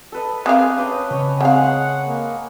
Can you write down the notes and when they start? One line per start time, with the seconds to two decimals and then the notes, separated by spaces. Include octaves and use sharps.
0.12 A4 B4 D#5
0.46 C4 G#4 A#4 F5 G5 D6 D#6 F#6
0.78 C#4 B4 G5 A5
1.11 C#3 C#5 D#5
1.41 G#3 C4 G#4 F5 F#5
2.07 A#3